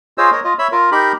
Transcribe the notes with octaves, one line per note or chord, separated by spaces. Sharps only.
F4 G#4 C5 C#5 D#5 E6
A#4 C#5 D#5
F4 D#5
C#5 E5 B5 E6
F4 A#4
D#4 G4 A#4 B5